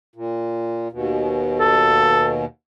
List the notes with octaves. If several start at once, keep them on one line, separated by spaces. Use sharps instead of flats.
A#2
D#2 B2
A4